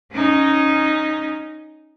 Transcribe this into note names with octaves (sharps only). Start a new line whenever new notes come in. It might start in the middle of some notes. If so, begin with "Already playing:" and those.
C#4 D#4